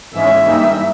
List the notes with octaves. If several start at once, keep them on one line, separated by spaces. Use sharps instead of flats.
G#2 E3 G#3 C#4 E5
G2 E3 G3 A#3 D#4